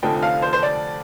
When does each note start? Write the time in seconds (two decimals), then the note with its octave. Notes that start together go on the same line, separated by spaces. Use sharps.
0.02 F1 F2 D3 F3 G5
0.22 F5
0.42 C5
0.53 C5
0.63 D5